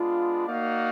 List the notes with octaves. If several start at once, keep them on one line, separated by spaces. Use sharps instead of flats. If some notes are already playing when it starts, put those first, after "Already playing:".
Already playing: G#3 B3 D4 F4
A#3 D#4 F#4 D5 F5